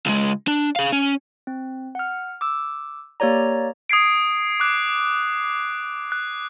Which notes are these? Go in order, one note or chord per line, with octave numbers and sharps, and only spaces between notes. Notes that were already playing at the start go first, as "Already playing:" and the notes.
C#2 G#3
D4
G#4 F5
C#4
C4
F#5 F6
D6 E6
A#3 G4 C#5 D5 A#5
D#6 G#6 C7 D7
D6 F#6
F#6